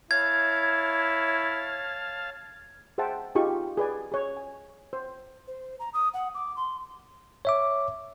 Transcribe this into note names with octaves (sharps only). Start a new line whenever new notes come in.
E4 C#5 F5 A5 G#6
G#4 C5 E5 F#5 G5 A5
D#4 F4 G4 G#4 C#6
G#4 B4 D5 G#5
G#4 C#5
G#5
C5
C5
A#5
D#6
F#5
D6
C6
C#5 E5 D6